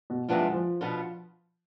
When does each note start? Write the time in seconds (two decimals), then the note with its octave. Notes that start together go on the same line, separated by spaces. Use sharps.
0.10 B2
0.28 C3 E3 F3 B3 D4 F4
0.40 G#3
0.53 F3
0.81 B2 B3 D4 F4